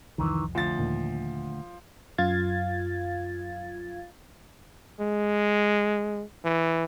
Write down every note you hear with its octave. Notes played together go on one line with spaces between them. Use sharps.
C2 F2 D#3 E3
D2 F3 A6
D#2 A#2
F#2 F4 F5 G#6 A6
G#3
E3